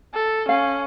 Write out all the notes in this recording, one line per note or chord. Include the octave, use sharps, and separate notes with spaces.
A4
C#4 F5